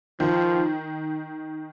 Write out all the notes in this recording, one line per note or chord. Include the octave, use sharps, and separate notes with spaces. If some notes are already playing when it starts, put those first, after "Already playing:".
D#3 F3